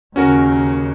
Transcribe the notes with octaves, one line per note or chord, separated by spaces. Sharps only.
D#2 C#3 C#4 F#4 A#4